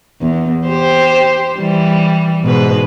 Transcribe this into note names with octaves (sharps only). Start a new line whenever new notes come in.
E2
G4 C5
E3 G3
G#2 B2 B4